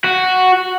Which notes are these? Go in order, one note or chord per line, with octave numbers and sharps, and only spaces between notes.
F#4